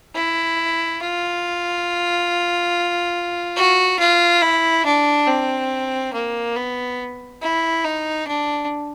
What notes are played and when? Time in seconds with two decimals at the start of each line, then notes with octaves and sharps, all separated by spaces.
0.14 E4
1.00 F4
3.56 F#4
3.99 F4
4.42 E4
4.85 D4
5.27 C4
6.13 A#3
6.56 B3
7.41 E4
7.85 D#4
8.27 D4